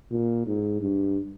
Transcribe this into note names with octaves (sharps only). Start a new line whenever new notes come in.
A#2
G#2
G2